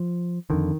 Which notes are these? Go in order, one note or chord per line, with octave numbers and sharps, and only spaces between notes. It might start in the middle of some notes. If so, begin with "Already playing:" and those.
Already playing: F3
F2 D3 D#3